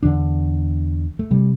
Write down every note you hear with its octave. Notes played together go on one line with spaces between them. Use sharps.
E2 D3 D4
A3
C3 G3